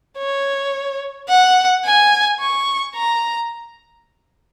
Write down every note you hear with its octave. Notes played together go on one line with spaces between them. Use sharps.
C#5
F#5
G#5
C#6
A#5